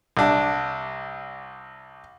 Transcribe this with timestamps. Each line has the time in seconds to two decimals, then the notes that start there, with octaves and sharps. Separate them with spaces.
0.17 C2 D4